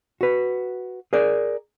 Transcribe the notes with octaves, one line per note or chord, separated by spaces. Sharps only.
F#4 B4
G#4 A#4 D5